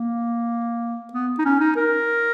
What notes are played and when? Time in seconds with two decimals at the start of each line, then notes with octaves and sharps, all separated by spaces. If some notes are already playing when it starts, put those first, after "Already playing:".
Already playing: A#3
1.13 B3
1.39 D#4
1.45 C#4
1.60 D#4
1.76 A#4